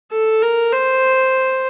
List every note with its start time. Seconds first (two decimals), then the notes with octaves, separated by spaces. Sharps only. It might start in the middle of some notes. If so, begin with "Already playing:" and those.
0.12 A4
0.42 A#4
0.72 C5